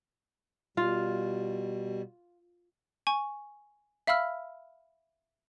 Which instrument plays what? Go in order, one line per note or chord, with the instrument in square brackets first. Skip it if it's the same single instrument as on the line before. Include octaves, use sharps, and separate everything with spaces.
[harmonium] B2 G3 [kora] F4
[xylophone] G#5 C#6
E5 F5 B5 E6 F6